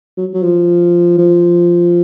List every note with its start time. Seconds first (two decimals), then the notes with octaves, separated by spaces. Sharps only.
0.17 F#3
0.34 F#3
0.43 F3
1.18 F3